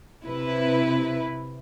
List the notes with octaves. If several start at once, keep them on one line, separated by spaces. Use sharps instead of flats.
C3 E4 B4